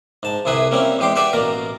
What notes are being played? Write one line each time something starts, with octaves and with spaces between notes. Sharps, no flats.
G#2 A5
C2 C3 E4 G#4 B4
G3 A#3 C4 C#4 E4
E2 G#3 G4 G5 C6
G4 B4 D5 E5 F#5 G5
A1 B2 A#3 A#4